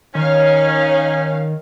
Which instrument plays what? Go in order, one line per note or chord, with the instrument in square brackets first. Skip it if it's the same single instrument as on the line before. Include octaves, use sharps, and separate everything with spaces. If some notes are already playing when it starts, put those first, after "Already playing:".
[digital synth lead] D#3 [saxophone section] C#4 D#4 [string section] C#5 F5